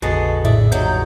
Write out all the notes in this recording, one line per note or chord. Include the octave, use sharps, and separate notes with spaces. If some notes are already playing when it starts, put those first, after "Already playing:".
A#1 F2 D3 G#3 B3 F#4 G#4 A4
A2 E4 G#4 D5 E5
G2 F#3 D#4 G6